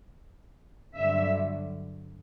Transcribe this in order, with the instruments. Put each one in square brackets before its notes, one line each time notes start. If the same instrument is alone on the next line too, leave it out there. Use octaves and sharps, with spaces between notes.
[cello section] G2 D3 F#3 E5